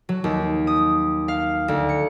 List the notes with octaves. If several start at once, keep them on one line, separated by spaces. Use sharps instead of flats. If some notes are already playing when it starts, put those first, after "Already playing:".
F#3
D#2
D#6
F5
D2
C#7